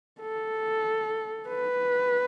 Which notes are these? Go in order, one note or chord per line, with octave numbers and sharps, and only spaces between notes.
A4
B4